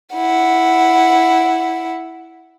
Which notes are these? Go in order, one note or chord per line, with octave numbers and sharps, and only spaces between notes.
E4 F#5